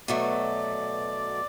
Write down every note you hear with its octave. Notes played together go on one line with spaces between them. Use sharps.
B2 F#3 A3 D5